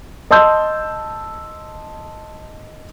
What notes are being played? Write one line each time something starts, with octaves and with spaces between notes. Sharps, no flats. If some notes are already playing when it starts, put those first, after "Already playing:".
D#5 A5 C6 E6 G6